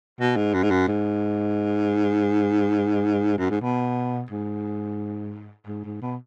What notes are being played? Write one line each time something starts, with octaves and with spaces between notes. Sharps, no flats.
B2
G#2
F#2
G#2
F#2
G#2
F#2
G#2
B2
G#2
G#2
G#2
B2